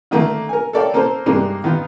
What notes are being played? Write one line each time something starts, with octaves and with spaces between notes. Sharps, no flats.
D3 D#3 A3 A#3
A#4 G#5
A4 A#4 C#5 D5 F5 G5
A#3 A4 A#4 C5
G2 C3 G#3 A#3 D4 D#4
D#3 B3 D#4 F4